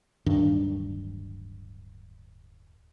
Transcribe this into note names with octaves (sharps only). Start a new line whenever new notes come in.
D1 G2 D#3 D4